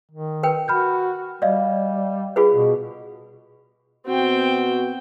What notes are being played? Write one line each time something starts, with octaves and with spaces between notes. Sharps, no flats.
D#3
A#4 B4 G5
F#4 B5 F6 G6
G3 D5 D#5 F5
F4 G#4 B4
B2
B2 B3 C4 F#4 G5